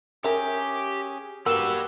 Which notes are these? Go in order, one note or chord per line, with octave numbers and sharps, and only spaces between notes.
C#4 G4 G#4 A#4 E5
A#3 F#4 G4 B4 E6 F#6 E7 G7